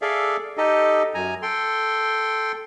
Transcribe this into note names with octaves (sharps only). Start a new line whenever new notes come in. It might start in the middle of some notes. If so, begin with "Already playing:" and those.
G#4 A4 D5 E5 F5
D#4 G4 A4 D#5
F#2 G#5 A#5
A4 G5 C6